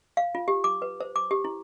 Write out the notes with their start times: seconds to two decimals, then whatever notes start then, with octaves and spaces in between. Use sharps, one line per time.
0.17 F5
0.35 F4
0.48 G4
0.64 D6
0.82 B4
1.00 C5
1.16 D6
1.31 G4
1.45 E4